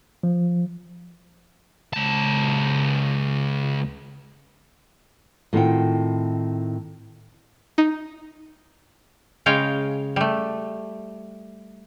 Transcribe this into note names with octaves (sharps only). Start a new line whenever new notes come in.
F3
C#2 A5
A2 D#3 C4 F4 F#5 G5
D#4
C#3 G#3 C#5 F5 G5
G3 A3